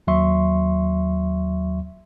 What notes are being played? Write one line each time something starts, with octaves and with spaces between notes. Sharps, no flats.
D#2 F#3 E5 C6 C#6